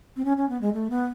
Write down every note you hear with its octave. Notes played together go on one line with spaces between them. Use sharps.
C4
C#4
C#4
B3
G#3
A3
B3